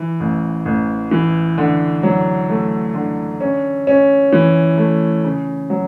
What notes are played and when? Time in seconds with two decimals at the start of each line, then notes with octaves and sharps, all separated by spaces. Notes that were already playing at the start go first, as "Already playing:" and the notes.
Already playing: E3
0.20 A1
0.65 A1
1.11 E3
1.58 D3
2.03 F#3
2.50 A3
2.94 D3
3.41 C#4
3.87 C#4
4.33 E3
4.78 A3
5.24 C#3
5.70 F#3